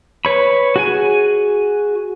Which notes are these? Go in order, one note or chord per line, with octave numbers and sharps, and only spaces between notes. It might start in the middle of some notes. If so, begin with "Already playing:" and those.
B4 C#5 B5
F#4 G#4 G#5